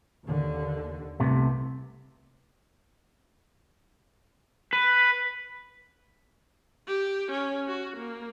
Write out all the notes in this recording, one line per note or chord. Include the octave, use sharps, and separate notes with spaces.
D#2 D3
C2 C3 A3 B3
B4
G4
C#4
F#4
A#3